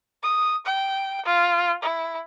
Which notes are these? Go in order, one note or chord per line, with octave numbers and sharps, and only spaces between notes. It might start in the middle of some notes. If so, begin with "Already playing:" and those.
D#6
G5
F4
E4